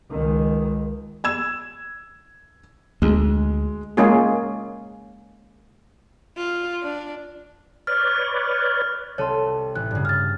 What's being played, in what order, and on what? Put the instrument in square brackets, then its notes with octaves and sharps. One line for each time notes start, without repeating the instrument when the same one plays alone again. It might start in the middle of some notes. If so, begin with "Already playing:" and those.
[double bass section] C#2 D#3 G#3
[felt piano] E6 G#6 E7
[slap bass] D2 [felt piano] G#3
[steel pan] G#3 A#3 C#4 F4 G#4
[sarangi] F4
D4
[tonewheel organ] B4 C#5 D5 [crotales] F6
[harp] C2 A4 D#7 [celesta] C#5 C6
[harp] A1 [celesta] F#6
[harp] G2 C#3
[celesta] F6 A6